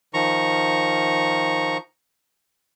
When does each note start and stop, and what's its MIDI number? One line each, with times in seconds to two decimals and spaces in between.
0.14 1.77 51
0.14 1.77 53
0.14 1.77 82
0.14 1.77 85